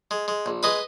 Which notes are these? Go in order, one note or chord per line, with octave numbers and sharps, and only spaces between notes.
G#3
G#3
A#1
G#3 B4 D#5